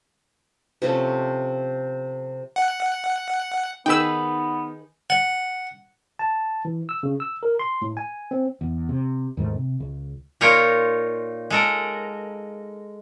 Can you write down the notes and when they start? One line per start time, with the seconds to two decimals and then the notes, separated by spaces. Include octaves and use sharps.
0.82 C3 F3 A3 C#4
2.56 F#5
3.86 D#3 B3 D#4 G#4 B4 G5 E6
5.10 F#5
6.19 A5
6.65 E3
6.89 E6
7.03 C#3
7.20 E6
7.43 A#4
7.59 C6
7.82 A2
7.97 G#5
8.31 C4
8.61 E2
8.89 C3
9.37 D#2 G#2 G3 A3
9.55 C3
9.80 C#2
10.41 A#2 D#4 F4 A#4 C#5
11.50 G#3 A4 A#4